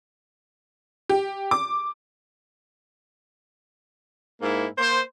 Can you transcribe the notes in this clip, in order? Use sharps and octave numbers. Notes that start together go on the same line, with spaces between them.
G4
D6
G#2 A#3 E4
A#3 C5